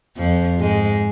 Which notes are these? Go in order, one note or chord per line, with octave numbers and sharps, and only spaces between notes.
F2 F3
G#2 G#3